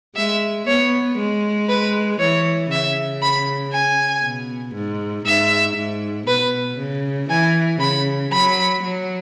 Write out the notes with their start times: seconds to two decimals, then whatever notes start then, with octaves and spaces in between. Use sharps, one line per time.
0.16 G#3 E5
0.67 B3 C#5
1.18 G#3
1.69 B4
2.19 E3 C#5
2.71 C#3 E5
3.23 B5
3.73 G#5
4.24 B2
4.75 G#2
5.26 G#2 E5
5.76 G#2
6.27 B2 B4
6.79 C#3
7.30 E3 G#5
7.80 C#3 B5
8.32 F#3 B5
8.83 F#3